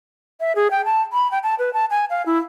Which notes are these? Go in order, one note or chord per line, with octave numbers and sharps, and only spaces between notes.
E5
G#4
G5
A5
B5
G5
A5
B4
A5
G#5
F5
E4